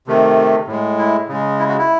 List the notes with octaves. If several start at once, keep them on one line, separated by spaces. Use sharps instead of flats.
C3 D#3 A3
A2 G#3
E4
C#3 G#3
E4
F#4
E4